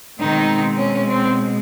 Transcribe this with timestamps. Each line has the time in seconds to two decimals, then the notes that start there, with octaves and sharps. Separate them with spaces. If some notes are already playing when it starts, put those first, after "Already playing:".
0.19 B2 D#3 G#3 C4 D#4
0.78 C#4
1.07 C4